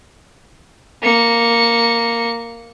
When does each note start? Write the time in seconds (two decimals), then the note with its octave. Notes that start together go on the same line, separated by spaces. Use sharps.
1.03 A#3 C#7